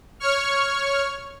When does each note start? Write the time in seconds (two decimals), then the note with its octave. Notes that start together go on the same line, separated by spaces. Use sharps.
0.20 C#5 C#6 F6